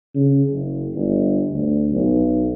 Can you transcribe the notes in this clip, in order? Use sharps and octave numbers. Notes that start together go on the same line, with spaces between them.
C#3
F#1
G1
D2
B1